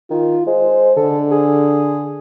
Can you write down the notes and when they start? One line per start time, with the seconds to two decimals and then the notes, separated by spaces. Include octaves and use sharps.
0.10 D#3 F4
0.47 G#3 C5
0.97 D3 A4
1.32 G#4